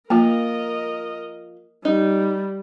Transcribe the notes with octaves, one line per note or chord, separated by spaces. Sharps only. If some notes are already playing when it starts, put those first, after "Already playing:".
F3 A#3 F4 A#4 D#5
G3 D#4